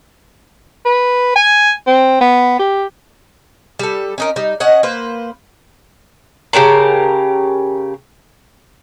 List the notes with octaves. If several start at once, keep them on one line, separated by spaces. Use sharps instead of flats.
B4
G#5
C4
B3
G4
G3 A4
C#4 D#4 A#4
G3 D#4
C#4 D#5 F#5
A#3 B4 C5
C#3 G4 A#4 A5